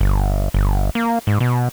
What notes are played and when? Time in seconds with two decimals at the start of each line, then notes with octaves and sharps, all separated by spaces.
0.01 G1
0.54 G1
0.95 A#3
1.27 G#2
1.40 B2